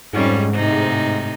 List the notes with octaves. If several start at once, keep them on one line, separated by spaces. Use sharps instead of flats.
F2 G#2 G3 C#4
A2 C3 D#4